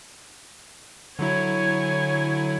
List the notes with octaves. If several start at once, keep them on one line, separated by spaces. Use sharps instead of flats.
D3 F#3 E4 C#5 G#5